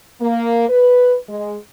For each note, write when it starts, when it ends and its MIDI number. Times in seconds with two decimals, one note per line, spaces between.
0.21 0.68 58
0.69 1.16 71
1.28 1.57 56